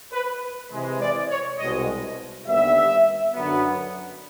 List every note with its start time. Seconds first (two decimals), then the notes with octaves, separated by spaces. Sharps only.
0.12 B4
0.71 C3 E3 G#3
1.00 D5
1.29 C#5
1.58 C2 B2 G#3 D#5
2.45 D#2 D3 G3 B3 E5
3.34 F#2 D3 F#3 B3